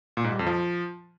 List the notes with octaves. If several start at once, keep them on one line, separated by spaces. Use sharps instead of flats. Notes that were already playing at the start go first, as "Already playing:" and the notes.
A#2
G#2
G3
F2
F3